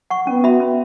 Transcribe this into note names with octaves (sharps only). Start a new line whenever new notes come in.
F#5 C#6
B3 C#4
F#4 E5 B5
C#4